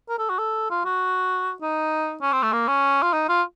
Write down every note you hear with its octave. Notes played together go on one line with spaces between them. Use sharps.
A#4
A4
F#4
A4
F4
F#4
D#4
C#4
C4
A3
A#3
C#4
F4
D#4
F4